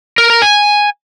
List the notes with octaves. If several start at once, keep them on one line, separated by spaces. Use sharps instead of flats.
A#4
A#4
G#5